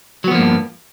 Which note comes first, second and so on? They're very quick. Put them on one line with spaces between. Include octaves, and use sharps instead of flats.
F#3 B3 F3 A#3 G2